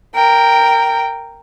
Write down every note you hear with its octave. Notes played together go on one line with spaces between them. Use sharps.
A#4 G5